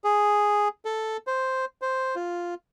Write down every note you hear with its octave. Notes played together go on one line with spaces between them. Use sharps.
G#4
A4
C5
C5
F4